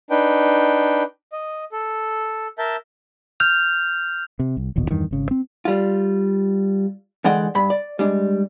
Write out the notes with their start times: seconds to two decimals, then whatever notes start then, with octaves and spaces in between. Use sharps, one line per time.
0.10 D4 D#4 B4 G5
1.32 D#5
1.72 A4
2.58 A#4 E5 A5 G6
3.40 F6 G6 F7
4.39 C3
4.57 C2
4.76 D#1 A1 D#2 B2
4.91 E2 G2 D#3
5.11 G#1 C#3
5.31 C4
5.65 G3 F4
7.24 D3 E3 G#3 D5 F#5 G5
7.55 G2 B5
7.70 D5
7.99 G3 G#3 D4